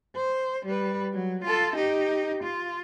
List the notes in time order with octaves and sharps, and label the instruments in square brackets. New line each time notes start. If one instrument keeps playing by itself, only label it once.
[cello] C5
G3 B4
F#3
F4 A4
D#4 G4
F4